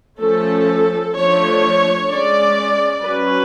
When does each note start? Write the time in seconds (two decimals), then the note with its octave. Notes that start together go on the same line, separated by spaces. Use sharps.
0.21 F3 A3 C#4 A4
1.16 F3 A3 D4 C#5
2.10 G#3 C#4 D5
3.04 F#3 C#4 B4